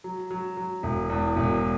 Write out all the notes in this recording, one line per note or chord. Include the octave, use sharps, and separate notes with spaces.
F#3
F#3
F#3
E1
E2
E1